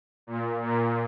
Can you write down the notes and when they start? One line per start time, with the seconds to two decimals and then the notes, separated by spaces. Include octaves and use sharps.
0.27 A#2
0.62 A#2